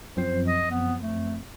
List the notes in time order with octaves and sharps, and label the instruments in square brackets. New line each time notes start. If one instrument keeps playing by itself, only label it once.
[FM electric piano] F#2 F3 C4 [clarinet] C5
[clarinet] D#5
B3
A3